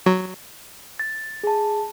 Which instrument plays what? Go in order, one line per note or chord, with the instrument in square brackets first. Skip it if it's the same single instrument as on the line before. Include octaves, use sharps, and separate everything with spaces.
[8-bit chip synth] F#3
[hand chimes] A6
G#4 A5